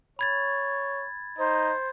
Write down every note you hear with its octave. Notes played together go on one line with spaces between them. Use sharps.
C#5 B5 G#6 A6
D#4 C5